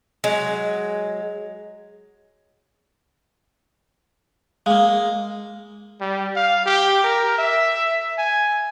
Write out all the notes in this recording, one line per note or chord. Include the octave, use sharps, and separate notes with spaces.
F#3 G#3
G#3 A#3 F5
G3
F5
G4
A#4
E5
G#5